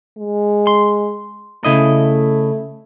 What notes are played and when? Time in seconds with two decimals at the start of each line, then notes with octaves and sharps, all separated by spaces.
0.18 G#3
0.67 C6
1.65 C#3 A3 E4 D#5